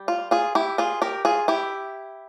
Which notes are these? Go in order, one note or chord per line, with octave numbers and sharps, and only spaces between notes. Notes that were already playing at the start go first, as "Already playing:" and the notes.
Already playing: G3
F4
F4 G#4
E4 G4
F4 G#4
G4 A#4
F4 G#4
E4 G4